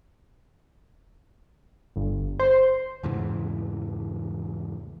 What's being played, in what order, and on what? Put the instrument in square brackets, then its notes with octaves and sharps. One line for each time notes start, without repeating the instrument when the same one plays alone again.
[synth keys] G1
C5
[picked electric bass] E2 G#2 C#3 E3